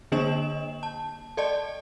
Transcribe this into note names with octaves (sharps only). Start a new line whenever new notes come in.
D3 A#3 D4 D#5 E7 F#7
A5
A4 D5 D#5 A5